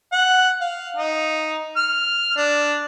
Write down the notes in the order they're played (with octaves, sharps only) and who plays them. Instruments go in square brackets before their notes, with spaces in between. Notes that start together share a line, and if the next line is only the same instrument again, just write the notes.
[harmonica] F#5
F5
D#4
F6
D4